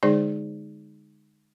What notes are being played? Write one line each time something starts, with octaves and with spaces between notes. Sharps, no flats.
D3 G#3 D#4 G#4 C5 D5